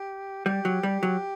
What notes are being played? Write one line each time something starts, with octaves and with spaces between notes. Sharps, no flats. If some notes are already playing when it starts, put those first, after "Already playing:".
Already playing: G4
G3 G4
F#3
G3
F#3